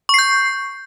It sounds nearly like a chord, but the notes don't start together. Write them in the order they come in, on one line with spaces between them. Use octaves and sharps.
C#6 C7 G6